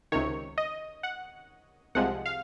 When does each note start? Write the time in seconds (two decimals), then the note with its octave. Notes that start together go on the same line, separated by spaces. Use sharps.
0.12 C#2 C3 D#3 C#5
0.58 D#5
1.03 F#5
1.95 C2 C3 F3 G#3 F#5
2.26 F5